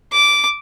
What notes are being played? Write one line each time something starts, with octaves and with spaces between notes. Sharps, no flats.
D6